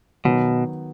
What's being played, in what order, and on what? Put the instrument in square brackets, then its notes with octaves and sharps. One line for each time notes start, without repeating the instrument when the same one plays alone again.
[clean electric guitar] B2 [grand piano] D#3 F#3 B3